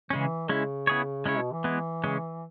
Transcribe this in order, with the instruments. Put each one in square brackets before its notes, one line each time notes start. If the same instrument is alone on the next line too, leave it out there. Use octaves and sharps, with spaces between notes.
[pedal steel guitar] C#3 G#3 C#4 [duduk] E3
[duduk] C#3 [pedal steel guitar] G#3 C#4 E4
[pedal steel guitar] B3 E4 G#4 C#5
[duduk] C#3 [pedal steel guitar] G#3 C#4 E4 C#5
[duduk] B2
E3
[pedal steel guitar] G#3 B3 E4
C#3 G#3 C#4